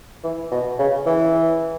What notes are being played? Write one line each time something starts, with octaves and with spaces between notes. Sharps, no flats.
E3
B2
C#3
E3